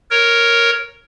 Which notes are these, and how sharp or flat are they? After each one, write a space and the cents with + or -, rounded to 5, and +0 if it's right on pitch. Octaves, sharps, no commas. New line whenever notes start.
A#4 +0 C#5 +0